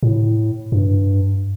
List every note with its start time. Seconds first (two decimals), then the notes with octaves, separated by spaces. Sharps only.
0.03 A2
0.72 G2